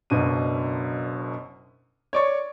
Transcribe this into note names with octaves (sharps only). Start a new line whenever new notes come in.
F#1 F#2 B2 D4 D#7
C#5 D5 C#6